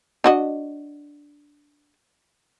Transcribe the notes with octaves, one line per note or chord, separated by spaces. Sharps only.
D4 F#4 D#5